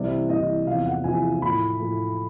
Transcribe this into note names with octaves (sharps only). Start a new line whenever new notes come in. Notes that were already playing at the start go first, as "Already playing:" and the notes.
Already playing: C2 C3 E3 G3 D5
C2 C3 E3 G3 D#5
E2 C3 F3 F5
F#5
E2 C3 F3 G#5
A2 F3 A3 B5
A2 F3 A3